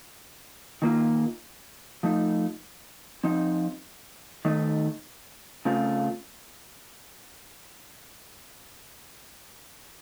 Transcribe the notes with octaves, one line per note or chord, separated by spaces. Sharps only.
D#3 A#3 F4
F3 A3 D#4
F3 C4 D#4
D#3 A3 D#4
C#3 A3 C4 F4